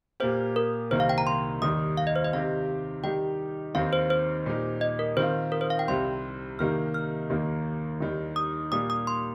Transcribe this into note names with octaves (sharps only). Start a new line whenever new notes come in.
A#2 A#3 G4 C5
A#4
C2 C3 D#3 A#3 C5
F5
G5
A#5
C6
D#2 D#3 G3 D#6
F5
D#5
C5
D#5
C3 D#3 C4 G4 F5
D#3 G3 D#4 G4 G5
D#2 D#3 C4 F5
C5
C5
A#2 G3 D#4 G4
D#5
A#4
D#3 C4 F4 C5
A#4
C5
F5
G5
C2 C3 G3 C4 C6
C3 D#3 G3 A#3 D#4 F6
F6
D#2 D#3 A#3
D#2 D#3 G3
D#6
A#2 G3 A#3 G4 D#6
D#6
C6